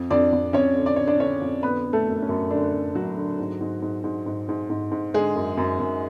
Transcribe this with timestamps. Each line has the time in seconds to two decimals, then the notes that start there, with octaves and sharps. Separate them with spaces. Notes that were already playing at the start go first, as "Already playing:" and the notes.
Already playing: F2
0.10 F2 D4 D5
0.33 F2
0.53 F2 C#4 C#5
0.75 D3
0.86 D5
0.96 D3 C#5
1.07 D4 D5
1.20 D3 C#4 C#5
1.42 F2
1.63 D3 B3 B4
1.85 D3
1.93 A3 A4
2.07 F#2
2.22 C#4
2.29 F#2
2.50 D3 D4
2.74 F#2
2.95 F#2 F#3 F#4
3.17 D3
3.39 G#2
3.61 G#2
3.82 G#2
4.04 G#2
4.26 G#2
4.49 G#2
4.70 G#2
4.92 G#2
5.14 D3 G#3 G#4
5.35 F#2
5.57 F#2
5.79 F#2